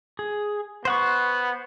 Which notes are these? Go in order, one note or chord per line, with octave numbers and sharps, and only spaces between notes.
G#4
B3 C5 F#5 C#6